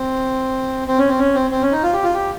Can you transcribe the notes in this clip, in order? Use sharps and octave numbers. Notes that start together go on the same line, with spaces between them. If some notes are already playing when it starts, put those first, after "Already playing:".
Already playing: C4
C4
C#4
C4
C#4
C4
C4
C#4
D#4
F4
G4
F4
G4